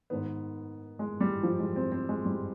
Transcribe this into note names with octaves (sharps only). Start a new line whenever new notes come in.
G#2 D#3 B3
G#3
G3
F3
G#3
C4
C4
G#3
G3